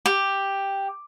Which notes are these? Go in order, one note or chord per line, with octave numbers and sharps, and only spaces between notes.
G4